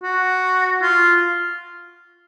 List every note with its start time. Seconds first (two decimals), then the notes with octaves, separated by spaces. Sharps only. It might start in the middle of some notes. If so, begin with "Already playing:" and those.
0.03 F#4
0.82 F4